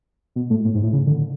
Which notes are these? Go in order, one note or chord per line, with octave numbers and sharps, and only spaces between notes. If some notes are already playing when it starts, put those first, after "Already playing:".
B2
A2
A2
G#2
A2
C#3
D3